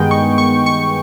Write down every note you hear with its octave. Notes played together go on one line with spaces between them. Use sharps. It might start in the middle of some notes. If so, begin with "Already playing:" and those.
Already playing: G2 D#3 G#3 B3 D#4 G5
C#6
C#6
C#6